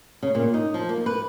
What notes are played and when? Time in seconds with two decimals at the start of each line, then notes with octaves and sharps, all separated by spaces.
0.23 C#3
0.35 A#2
0.54 D#4
0.74 F3
0.89 A#3
1.06 B4